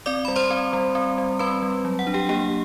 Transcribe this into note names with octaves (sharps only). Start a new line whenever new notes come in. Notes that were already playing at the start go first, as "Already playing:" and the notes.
C4 D5 D6
G3 B5
C5 C6
C4
G3
C4
G3
C4 B4 B5
G3
F#3
F#5
D4
G4 G5
A#3 G4 G5